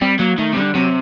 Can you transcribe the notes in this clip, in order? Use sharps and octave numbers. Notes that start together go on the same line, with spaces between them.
G3 C4
F#3 A#3
D#3 A3
C3
D3 G3
C3 F#3